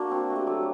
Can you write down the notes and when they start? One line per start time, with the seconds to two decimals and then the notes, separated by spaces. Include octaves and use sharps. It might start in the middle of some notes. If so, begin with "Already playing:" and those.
Already playing: A#3 D4 F#4
0.11 C4
0.30 A3
0.36 G4
0.47 F#3 A4